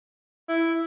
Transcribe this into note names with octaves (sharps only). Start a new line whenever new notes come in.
E4